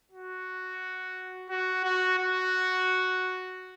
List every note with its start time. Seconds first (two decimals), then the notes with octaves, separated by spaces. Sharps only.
0.12 F#4
1.50 F#4
1.84 F#4
2.18 F#4